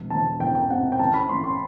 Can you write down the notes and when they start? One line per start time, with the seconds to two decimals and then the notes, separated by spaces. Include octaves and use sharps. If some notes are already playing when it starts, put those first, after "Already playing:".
Already playing: E1
0.10 E1 A5
0.40 E2 G5
0.55 G5
0.69 C3 F#5
0.92 G5
0.99 A1 A5
1.14 B5
1.29 A1 C6
1.44 C6